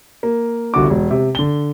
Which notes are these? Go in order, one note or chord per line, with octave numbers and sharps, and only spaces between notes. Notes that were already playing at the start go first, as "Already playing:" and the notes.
A#3
G1 C2 D3 F#4 D6
E1
C3
D3 G7